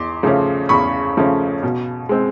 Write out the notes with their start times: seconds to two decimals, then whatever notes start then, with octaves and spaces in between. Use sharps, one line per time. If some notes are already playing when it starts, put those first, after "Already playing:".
Already playing: E2 C6 D6
0.23 C#3 F3 A3 C#4
0.69 E2 B5 C#6
1.17 C#3 F3 A3 C#4
1.63 B2
2.09 G#3 C4